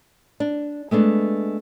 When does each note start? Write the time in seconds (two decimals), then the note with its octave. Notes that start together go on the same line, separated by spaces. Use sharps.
0.40 D4
0.91 G#3 A3 B3 D4